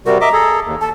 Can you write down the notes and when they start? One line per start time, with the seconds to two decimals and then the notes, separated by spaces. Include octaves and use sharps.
0.06 C3 G3 F#4 A#4
0.21 D#5 E5 A#5 D6
0.33 G#4 A4
0.65 D#2
0.81 A4 A5